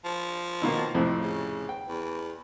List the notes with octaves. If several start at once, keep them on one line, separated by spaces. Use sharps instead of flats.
F3
B2 D#3 A#3
F2 A2 C3
C#3
G5
E2